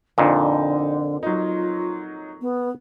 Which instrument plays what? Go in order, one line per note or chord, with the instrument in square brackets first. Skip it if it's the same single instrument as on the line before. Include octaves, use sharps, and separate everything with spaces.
[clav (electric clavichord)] F2 A#2 [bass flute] D3 [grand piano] D#4
[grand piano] F#3 D#4 [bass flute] F4
[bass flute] B3